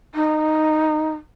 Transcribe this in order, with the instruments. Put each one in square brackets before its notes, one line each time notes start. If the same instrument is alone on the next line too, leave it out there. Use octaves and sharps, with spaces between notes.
[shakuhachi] D#4